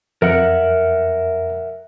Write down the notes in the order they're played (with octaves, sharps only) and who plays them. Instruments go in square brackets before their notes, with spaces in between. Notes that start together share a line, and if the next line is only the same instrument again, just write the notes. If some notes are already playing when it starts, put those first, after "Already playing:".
[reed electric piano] F2 [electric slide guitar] A#4 E5 F#5